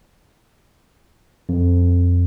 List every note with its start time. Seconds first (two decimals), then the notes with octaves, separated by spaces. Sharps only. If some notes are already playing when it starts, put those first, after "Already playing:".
1.49 F2